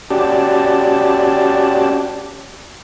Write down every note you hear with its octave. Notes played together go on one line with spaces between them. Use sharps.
C#4 F#4 G4 D5 A5